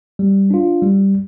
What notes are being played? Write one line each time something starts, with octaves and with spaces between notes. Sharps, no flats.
G3
D4 F4
G3